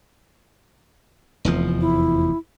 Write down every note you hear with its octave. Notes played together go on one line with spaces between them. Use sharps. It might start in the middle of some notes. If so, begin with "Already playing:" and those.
F1 E2 F3
E4